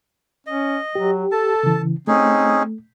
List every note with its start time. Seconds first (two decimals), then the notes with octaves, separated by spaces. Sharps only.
0.47 C#4 D#5
0.95 F#3 G4
1.32 A4 A5
1.63 C#3 E3
2.07 A3 C4 C#4 D#4 G#4